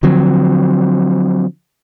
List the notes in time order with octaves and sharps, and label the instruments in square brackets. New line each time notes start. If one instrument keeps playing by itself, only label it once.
[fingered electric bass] D3 F3 F#3 C4